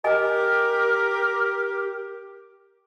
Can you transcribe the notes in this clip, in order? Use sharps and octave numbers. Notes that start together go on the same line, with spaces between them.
G4 A#4 D#5 G#5